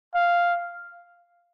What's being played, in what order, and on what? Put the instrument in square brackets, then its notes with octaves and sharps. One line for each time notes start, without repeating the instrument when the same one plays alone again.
[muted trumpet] F5